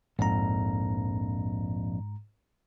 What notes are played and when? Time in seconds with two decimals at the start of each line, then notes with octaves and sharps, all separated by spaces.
0.19 A#1 F2 G#2 A#5